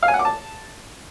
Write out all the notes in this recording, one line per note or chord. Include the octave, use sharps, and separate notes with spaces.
F5
G#5
F#5
D6
A5